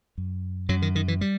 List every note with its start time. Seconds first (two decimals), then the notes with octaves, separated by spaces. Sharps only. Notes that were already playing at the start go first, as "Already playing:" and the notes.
0.18 F#2
0.69 F#2 F#3
0.82 D#3
0.95 D#3
1.08 E3
1.21 G3